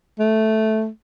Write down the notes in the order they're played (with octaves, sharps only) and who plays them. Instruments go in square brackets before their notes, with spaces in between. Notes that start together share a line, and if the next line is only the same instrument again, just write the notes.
[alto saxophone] A3